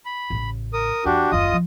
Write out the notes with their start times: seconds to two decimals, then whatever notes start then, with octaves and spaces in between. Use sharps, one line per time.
0.05 B5
0.30 A1 C#3
0.73 A#4 D#6
1.05 E2 D4 F#4 G4
1.32 F#1 D#2 F4 D#5 D#6
1.52 F3